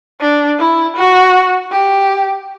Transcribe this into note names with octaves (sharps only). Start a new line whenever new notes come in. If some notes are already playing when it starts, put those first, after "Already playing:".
D4
E4
F#4
G4